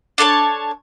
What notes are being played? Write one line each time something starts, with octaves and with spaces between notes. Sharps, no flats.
D4 A4 C#5 A5